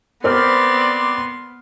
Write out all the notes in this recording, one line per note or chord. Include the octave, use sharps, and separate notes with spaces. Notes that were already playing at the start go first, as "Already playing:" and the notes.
B3 C4 A#4 C5 D5 C6 F6